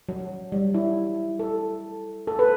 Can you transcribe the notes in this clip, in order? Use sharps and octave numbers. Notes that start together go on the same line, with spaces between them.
F#3
G3
E4
A4
A4
B4